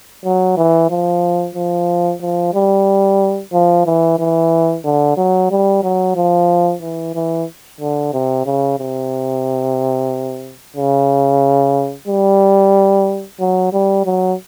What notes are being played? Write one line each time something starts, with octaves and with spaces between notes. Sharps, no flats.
F#3
E3
F3
F3
F3
G3
F3
E3
E3
D3
F#3
G3
F#3
F3
E3
E3
D3
C3
C#3
C3
C#3
G3
F#3
G3
F#3